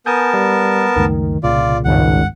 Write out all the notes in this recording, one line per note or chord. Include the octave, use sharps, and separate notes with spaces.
B3 A#4 G#5 A5 D#6 G6
G3
C#2 F#2 D#3 A3
C2 A#2 C#3 F4 D5
G#1 C#2 G2 F#5